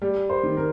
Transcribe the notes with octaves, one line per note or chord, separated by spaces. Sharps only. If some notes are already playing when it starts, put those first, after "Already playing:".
G3
C5
D#3
A#4